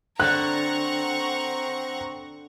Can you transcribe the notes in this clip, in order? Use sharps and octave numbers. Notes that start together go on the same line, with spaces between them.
D3 C4 F#5 A#5 C#6 F#6